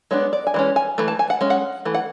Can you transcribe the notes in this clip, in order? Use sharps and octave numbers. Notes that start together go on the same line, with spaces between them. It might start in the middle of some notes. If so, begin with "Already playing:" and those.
G#3 B3 D4 C#5
D5
G#5
E3 G#3 C#4
G#5
E3 A3
A5
G#5
F#5
G#3 C#4
F#5
E3 A3
F#5